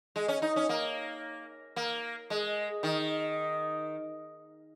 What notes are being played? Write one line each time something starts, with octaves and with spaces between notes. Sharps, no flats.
G#3
C#4
D#4
C#4
A#3
A#3
G#3
D#3